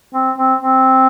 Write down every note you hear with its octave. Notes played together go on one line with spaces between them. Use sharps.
C4
C4
C4